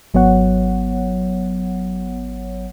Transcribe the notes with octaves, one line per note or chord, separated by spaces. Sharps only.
G#1 F#3 B3 C#5 F#5